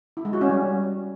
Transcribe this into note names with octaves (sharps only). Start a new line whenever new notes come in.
E4
G#3
F#4
C#4
G3